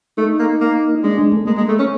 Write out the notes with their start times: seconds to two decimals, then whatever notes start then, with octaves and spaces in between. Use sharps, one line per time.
0.17 A3 D#4
0.39 A#3
0.61 A#3
1.03 G#3 D4
1.19 G#3
1.32 A3
1.47 G#3 A#3
1.57 G#3
1.68 A3
1.79 C#4